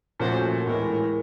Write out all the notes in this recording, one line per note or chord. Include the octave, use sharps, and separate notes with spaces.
A#2 F3 A3 C#4 F#4 C5
A2 E3 G#3 A#4